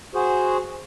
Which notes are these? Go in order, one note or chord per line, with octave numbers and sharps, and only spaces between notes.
F#4 G#4 C5